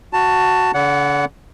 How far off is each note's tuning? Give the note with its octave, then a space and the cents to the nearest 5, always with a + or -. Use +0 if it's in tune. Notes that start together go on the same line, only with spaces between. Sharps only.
F#4 +0 A5 +15
D3 -40 D5 -45 F#5 +0